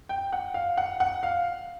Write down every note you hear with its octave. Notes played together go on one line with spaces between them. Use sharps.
G5
F#5
F5
F#5
F#5
F5